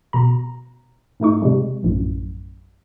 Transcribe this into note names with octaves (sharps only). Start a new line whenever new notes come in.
B2 A#5
G#2 A3 D#4 C#6
C3 G3 G#3
A#1 F#2 A2